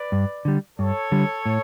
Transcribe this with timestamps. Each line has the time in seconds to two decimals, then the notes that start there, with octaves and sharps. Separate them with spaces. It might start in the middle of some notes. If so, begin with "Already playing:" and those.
Already playing: B4 D5
0.12 G2
0.45 D3 G3
0.78 G2 A4 C#5
1.12 D3 G3
1.46 A2